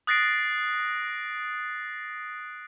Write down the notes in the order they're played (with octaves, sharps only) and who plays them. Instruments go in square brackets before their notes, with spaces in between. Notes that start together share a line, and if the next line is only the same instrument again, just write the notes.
[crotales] D#6 F#6 A6 A#6 C7 D7